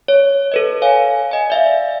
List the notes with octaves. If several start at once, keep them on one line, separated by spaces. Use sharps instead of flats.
C#5
A4 B4 D#5
C#5 F5 G#5
D#5 G#5
D5 E5 F5